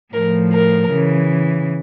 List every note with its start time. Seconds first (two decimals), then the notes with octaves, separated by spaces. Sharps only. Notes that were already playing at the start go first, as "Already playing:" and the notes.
0.14 A2 F3 A#4
0.53 A#4
0.92 C#3 E3